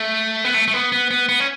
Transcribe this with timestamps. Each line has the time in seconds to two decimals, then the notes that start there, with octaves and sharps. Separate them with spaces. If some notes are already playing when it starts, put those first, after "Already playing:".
Already playing: A3
0.44 B3
0.54 A3
0.68 A3
0.74 B3
0.92 B3
1.11 B3
1.29 B3
1.40 C#4